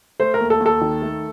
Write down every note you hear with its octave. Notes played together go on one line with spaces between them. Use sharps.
A3 C5
A#4
D#2
A4
D#2
A4
D#3
A3